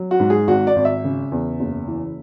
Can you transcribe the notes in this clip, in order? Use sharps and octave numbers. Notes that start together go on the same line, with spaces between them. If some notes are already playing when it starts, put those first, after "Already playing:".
Already playing: F#3
F#4
G#2
G#4
G#1 F#4
D5
G#1
E5
C#3
E2
F#1
E3